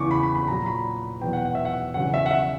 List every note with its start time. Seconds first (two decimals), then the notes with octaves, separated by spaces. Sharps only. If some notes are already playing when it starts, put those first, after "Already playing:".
Already playing: E2 C#3 E3 C#6 D6
0.11 B5
0.23 B5
0.35 B5
0.48 A#2 F#3 A#5
0.66 B5
1.21 E2 B2 F#3 G5
1.33 F#5
1.45 F#5
1.55 E5
1.65 F#5
1.94 E2 C#3 F#3 F#5
2.14 E5
2.26 F#5
2.31 E5